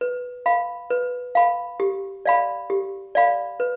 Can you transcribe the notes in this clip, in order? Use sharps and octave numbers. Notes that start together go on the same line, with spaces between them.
B4
F5 B5
B4
F5 B5
G4
D5 F5 B5
G4
D5 F5 B5
B4